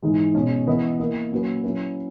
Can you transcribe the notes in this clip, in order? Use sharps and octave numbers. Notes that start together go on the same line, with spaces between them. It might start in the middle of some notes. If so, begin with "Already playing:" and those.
G#2 E3 G#3
B2 G#3 C#4
E3 B3 E4 B4 D#5
A#3 E4 A#4 D#5
A#2 F#3 C#4 F#4 B4
F#3 C#4 E4 B4